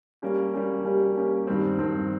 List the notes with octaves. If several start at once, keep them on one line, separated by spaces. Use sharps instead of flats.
G3 A#3 C#4 G4
G3 A#3 C#4 G4
G3 A#3 C#4 G4
G3 A#3 C#4 G4
G2 D#3 G3 C4
G2 D#3 G3 C4